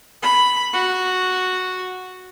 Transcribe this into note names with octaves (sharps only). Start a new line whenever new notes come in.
B5
F#4